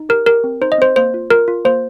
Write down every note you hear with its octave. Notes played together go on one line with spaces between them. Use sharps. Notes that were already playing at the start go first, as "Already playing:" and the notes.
Already playing: D#4
G4 A#4
G4 A#4
C4
D#4 C5
D#5
C4 C5
A#3 C5
F4
F4 A#4
F4
A#3 C5